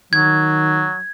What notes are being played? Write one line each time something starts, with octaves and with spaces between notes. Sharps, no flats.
D#3 F#3 G#6